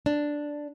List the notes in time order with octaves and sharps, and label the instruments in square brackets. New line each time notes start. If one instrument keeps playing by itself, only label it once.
[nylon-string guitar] D4